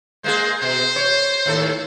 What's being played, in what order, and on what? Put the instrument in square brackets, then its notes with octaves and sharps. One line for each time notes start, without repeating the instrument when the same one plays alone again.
[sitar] G#3 A#3 G#4 [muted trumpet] C5
[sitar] B2 [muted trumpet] C5
[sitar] C#5
D#2 A2 A4